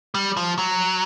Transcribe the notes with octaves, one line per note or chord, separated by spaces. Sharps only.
G3
F3
F#3